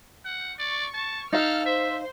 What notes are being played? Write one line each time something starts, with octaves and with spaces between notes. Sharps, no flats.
F#5
D5 C#6
A5
D#4 A4 F5 F6
C5 E5